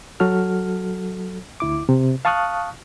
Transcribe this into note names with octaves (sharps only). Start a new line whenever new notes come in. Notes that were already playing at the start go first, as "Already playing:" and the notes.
F#3 F#4 A4 F6
D2 E4 D6
C3
F5 A5 C#6 D#6 F6 F#6